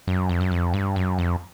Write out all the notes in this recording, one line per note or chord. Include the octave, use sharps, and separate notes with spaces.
F#2
F2
F#2
F2
G2
F#2
F2